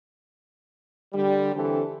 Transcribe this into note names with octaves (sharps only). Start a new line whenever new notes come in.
D3 G3
D3 E3 C4 G4 A4